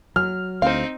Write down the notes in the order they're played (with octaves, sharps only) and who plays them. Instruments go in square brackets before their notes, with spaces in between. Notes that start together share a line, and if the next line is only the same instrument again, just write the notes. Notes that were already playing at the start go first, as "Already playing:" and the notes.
[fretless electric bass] F#3 [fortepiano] F6
[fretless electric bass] D2 [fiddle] C4 D#4 [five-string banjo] C5 F5